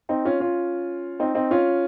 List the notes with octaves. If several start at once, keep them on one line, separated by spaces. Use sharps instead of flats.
C4 D#4
C#4 F4
C#4 F4
C4 D#4
C4 D#4
C#4 F4